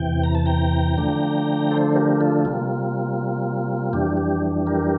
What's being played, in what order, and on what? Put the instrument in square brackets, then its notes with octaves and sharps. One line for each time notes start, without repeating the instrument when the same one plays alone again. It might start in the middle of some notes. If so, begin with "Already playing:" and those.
Already playing: [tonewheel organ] E2 C3 E3 G5
A#5
A5
G5 A#5
D3 F3 A3 D4
A4 C5
G4 A#4
F4 A4
C3 G3 A#3 F4
F2 E3 G3 D4 G4
G4
G4 A#4